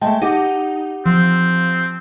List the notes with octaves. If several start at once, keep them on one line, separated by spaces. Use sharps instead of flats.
G#3 A3 G5 A5
D#4 G4 F#5
F3 C4